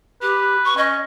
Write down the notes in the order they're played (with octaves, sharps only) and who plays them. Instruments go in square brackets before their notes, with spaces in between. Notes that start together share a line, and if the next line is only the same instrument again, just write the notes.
[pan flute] G4 [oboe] B4
[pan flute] C#6
[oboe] C#4 [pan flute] D#5